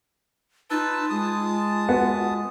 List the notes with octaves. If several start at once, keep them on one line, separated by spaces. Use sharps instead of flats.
D#4 F4 B4 A5 E6
G#3 A5 D#6
B3 F#4